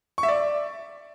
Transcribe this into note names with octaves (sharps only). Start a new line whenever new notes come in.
C#6
E5
D5